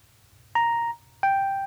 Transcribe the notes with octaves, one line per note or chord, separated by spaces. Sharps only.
A#5
G5